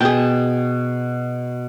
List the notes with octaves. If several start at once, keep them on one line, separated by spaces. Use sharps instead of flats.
B2 G#4 G5 A5